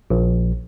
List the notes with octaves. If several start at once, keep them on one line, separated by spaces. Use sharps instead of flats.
A#1